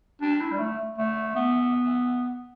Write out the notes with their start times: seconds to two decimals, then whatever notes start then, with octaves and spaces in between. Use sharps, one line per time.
0.21 D4
0.41 E4
0.52 G3
0.59 A3
0.98 A3
1.35 B3